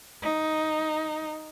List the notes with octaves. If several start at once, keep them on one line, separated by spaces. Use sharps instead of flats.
D#4